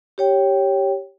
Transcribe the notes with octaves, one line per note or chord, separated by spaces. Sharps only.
G4 C#5 G5